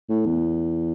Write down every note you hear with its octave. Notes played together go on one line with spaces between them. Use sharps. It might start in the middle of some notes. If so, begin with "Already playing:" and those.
A2
E2